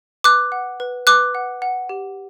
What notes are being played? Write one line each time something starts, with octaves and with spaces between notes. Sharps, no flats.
B4 D6 F#6
F#5
B4
B4 D6 F#6
F#5
F#5
G4